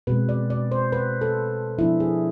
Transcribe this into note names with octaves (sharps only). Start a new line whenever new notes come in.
B2 G#3 C4 B4
D5
D5
C5
B4
A4
F3 B3 D4 E4
G#4